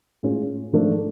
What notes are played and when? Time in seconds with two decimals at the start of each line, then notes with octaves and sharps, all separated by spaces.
0.23 A2 G#3 C#4 F4
0.73 G#2 F3 A3 D4